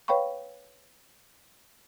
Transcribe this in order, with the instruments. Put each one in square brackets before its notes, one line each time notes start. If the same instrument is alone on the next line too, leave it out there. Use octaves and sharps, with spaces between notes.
[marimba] B4 C#5 F5 G5 B5 C#6